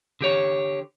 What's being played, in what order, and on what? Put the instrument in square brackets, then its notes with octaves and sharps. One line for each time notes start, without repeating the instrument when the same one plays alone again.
[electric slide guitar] D3 G4 C#5